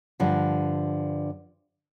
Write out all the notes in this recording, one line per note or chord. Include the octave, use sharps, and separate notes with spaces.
G2 D3 F3